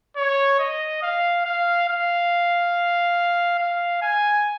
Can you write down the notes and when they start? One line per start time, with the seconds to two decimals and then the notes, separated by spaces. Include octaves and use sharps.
0.17 C#5
0.59 D#5
1.02 F5
1.45 F5
1.88 F5
3.59 F5
4.01 G#5